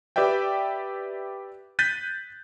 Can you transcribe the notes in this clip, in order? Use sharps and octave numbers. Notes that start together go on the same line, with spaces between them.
G4 B4 D5 E5 G5
F#6 G6 A6 B6 D#7